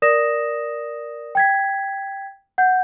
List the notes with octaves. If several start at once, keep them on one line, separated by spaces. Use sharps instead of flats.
A#4 D5 D#6 A#6 E7
G5 G#6 B6
F#5 G6